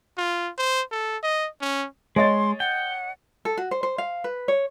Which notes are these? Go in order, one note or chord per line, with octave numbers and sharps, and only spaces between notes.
F4
C5
A4
D#5
C#4
G#3 C#5 D#5 C6 A6
F#5 G5
A4
F#4
C5
C5
F5
B4
C#5